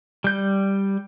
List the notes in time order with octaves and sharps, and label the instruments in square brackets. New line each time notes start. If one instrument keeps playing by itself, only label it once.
[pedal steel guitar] G3 G6